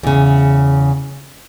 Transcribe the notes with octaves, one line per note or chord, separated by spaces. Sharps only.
E2 C#3